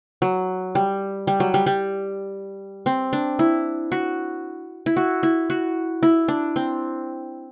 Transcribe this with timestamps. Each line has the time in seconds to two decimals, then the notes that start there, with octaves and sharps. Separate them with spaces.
0.22 F#3
0.75 G3
1.27 G3
1.40 F#3
1.54 G3
1.66 G3
2.86 C4
3.13 D4
3.39 E4
3.92 F#4
4.86 E4
4.97 F#4
5.23 E4
5.50 F#4
6.03 E4
6.28 D4
6.56 C4